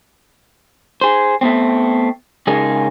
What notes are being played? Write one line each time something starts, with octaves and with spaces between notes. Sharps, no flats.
G#4 C5
A3 B3 C4
C#3 G#3 D#4 G#4 A#4